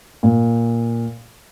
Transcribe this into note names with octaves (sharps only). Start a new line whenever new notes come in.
A#2